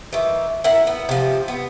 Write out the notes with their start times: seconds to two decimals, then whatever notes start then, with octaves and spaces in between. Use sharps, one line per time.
0.13 D#3 E3
0.64 E4 A#4 F#5
0.87 B3
1.09 C3 F3
1.48 B3